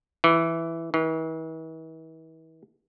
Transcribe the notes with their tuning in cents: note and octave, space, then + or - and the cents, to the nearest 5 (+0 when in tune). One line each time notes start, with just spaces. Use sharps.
E3 +5
E3 -40